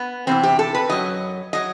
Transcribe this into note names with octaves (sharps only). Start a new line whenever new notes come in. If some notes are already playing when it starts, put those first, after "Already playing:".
Already playing: B3
E2 C3 E3 C4
G4
A4
B4
F#2 F#3 D#5
F#3 D#5